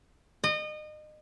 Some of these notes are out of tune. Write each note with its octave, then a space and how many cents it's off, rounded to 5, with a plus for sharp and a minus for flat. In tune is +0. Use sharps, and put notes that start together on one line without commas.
D#5 -30